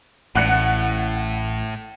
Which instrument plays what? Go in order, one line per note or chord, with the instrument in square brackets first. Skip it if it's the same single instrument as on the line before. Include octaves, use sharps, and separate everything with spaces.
[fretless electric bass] A1 [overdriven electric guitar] A2 [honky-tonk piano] F#5 F#6 C#7